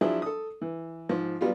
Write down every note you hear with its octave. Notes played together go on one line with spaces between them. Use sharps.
F3 F#3 D4 E4 G#4
A4 D#6
E3
G#2 F3
F#3 G3 B3 F4